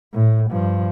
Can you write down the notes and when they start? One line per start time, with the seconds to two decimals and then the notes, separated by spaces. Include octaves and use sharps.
0.13 A2
0.51 G2 F3